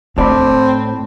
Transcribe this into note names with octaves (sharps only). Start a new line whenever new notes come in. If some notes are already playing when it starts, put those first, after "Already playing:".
A2 C4 D4 D5 A5 B5